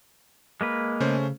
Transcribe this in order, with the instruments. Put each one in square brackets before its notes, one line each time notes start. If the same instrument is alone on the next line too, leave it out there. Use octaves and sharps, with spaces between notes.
[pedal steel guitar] G#3 A#3 B4
[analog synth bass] C#3 [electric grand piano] A3 C#4 C5